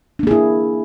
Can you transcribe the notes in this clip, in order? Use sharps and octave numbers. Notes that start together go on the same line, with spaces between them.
A#3 D4 E4 G#4